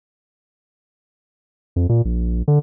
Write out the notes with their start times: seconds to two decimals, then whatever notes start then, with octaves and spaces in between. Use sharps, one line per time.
1.76 F2
1.89 A#2
2.05 A#1
2.48 D3